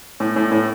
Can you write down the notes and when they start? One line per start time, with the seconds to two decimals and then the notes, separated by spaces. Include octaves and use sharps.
0.20 A2
0.36 A2
0.52 A2